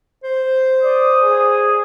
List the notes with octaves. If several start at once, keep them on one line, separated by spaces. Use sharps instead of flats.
C5
D5 D#6
G#4